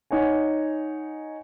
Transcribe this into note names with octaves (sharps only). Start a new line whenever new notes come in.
D#4 C#5 F#5 G#5